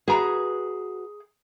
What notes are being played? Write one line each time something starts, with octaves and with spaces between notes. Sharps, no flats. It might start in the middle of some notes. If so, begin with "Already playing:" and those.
F#4 G#4 B4 A#5